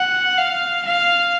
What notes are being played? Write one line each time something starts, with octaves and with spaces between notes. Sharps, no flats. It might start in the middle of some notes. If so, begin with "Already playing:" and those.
Already playing: F#5
F5
F5